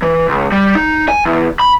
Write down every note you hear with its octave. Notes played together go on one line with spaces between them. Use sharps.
E3
C#2
G3
D#4
G#5
E2
B5